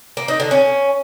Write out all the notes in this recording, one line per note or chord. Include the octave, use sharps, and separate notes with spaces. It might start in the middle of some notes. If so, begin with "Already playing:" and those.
A#3
D#4
D3
C#4